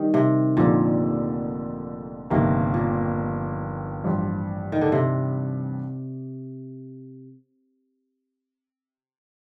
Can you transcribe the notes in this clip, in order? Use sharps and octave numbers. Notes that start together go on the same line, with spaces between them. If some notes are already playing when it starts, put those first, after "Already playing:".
Already playing: D#3 G3
C3
F1 F2 A#2 D3 F3
G1 F2 C3 D#3 A#3
A#2
A1 G2 F3
D#3
D3
C3